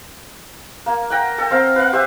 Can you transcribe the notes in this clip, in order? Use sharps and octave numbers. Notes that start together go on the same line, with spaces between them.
A#3
F#5 G5 A#5
A4 G5
C4 F5 A#5
B4 F5 F#5
G4 C5 E5